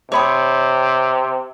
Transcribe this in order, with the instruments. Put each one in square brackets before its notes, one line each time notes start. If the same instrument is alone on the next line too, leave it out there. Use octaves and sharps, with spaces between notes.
[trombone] C3 [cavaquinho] C#5 B5 D#6